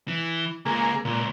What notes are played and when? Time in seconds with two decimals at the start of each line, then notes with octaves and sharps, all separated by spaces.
0.08 E3
0.65 C#2 A#3 G#4
1.05 C#2 A#2